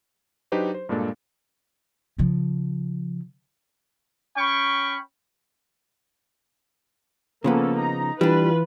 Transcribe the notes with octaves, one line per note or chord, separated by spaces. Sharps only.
F#3 D4 D#4 G4 B4 C5
C5
G2 A#2 G#3 A#3 D4 A4
C#3 F3
C#4 G5 B5 C#6
C#3 F3 A#3 B3 C#4 A4
D#4 A#5
E3 G3 D4 F4 B4